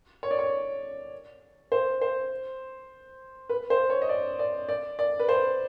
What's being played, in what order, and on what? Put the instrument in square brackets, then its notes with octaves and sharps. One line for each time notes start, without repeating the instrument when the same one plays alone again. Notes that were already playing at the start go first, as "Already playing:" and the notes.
[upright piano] C#5
D5
C#5
C5
C5
B4
C5
C#5
D#5
D5
D5
D5
D5
B4
C5